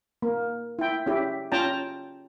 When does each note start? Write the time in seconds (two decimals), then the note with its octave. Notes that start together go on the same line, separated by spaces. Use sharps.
0.22 A#3
0.79 E4 G5
1.06 C#4 E4 G4
1.52 C#4 F4 G5 A5 A#5